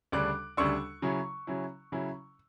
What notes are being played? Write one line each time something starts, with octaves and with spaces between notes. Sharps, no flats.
D2 C#3 G3 D4 D6 F#6
D2 C#3 G3 D4 C#6 E6
C#3 F#3 C#4 E4
C#3 F#3 C#4 E4
C#3 F#3 C#4 E4